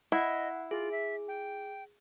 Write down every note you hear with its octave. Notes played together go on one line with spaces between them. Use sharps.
E4 D#5 F#5
F4 G#4
E5
G5